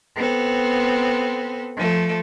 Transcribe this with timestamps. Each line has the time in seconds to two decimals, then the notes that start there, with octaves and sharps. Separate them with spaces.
0.17 B3 C4 A4
1.77 F3 A3